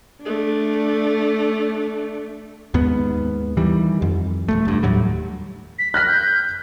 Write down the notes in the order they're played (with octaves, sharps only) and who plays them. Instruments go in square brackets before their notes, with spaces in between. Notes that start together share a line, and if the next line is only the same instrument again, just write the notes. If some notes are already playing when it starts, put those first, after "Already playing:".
[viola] A3 D4
[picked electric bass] D#2 G#2 B3
D#3 E3 G3
F2
D#1 D#2 A3
F1 G2
D#2 A2 F#3 G3
[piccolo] B6
[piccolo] F6 [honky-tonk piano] F#6 A#6 B6
[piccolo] G6